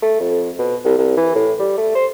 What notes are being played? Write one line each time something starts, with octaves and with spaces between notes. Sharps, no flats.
A3
F2
B2
C2
C2
E3
A2
G3
A3
C5